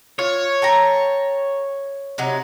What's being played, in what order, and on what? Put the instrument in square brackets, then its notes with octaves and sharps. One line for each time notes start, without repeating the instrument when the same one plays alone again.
[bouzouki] F4 [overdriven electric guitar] C#5
[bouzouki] A4 G5 A#5
C3 F#3 D#4